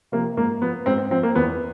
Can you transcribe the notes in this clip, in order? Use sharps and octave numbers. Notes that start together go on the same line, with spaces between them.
C3 F3 A#3
G#2 A#3
F3 B3
G#2 C4
C4
F3 C4
A#3
E2 B3